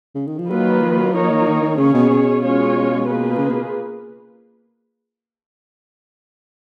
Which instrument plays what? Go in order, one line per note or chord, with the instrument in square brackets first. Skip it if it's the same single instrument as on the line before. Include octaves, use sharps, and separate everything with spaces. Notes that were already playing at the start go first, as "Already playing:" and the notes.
[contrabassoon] C#3
D#3
F3
[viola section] D#3 A#3 F4 B4 [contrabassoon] F#3
[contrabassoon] F3
F#3
[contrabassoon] F3 [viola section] A#3 D#4 A#4 C#5
[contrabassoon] D#3
F3
D#3
D#3
[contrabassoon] C#3 [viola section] C#4 G#4 C#5
[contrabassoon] B2
B2
[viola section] G#3 C#4 F4 G#4 C#5
A#3 F4 G#4 B4
[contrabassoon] C#3
B2